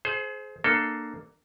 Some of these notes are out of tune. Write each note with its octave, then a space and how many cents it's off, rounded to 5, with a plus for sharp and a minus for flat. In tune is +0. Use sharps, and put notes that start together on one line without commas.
G#4 +35 C5 +0
A#3 +0 D4 +30 A4 +5